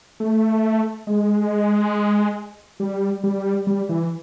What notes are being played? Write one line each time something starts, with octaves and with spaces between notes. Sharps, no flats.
A3
G#3
G3
G3
G3
E3